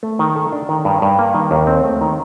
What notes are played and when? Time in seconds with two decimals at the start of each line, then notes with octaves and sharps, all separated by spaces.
0.03 A3
0.19 D#3
0.36 A4
0.52 D4
0.69 D#3
0.85 G2
1.02 G2
1.19 A#3
1.34 D#3
1.51 D#2
1.67 C4
1.84 A3
2.01 D#3